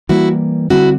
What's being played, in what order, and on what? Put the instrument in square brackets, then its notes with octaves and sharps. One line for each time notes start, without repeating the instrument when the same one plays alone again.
[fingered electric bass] E3 G3 A#3 [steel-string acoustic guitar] E4 F#4
[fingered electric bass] D3 G3 C4 [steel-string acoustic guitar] E4 F#4